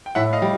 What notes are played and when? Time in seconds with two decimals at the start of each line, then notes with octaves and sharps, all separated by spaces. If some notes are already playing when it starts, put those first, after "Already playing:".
0.06 G5
0.15 A2 E5 F#5
0.33 D#5 F5
0.42 G3